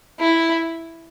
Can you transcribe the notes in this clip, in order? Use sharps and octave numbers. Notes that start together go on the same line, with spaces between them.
E4